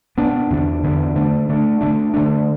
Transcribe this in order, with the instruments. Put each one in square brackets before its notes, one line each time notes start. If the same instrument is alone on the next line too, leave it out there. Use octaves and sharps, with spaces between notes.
[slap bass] B2 B3 D4
E2 D3 B3 D4
E2 D3 B3 D4
D3 A3 D4
D3 A3 D4
D3 A3 D4
D3 A3 D4